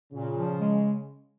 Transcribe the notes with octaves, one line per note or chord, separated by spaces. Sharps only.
A#2 C#3
F3
G#3